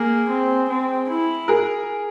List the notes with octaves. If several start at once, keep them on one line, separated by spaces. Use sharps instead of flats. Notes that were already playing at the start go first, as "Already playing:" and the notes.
Already playing: A#3 G#4
C4
C4
E4
G#4 A#4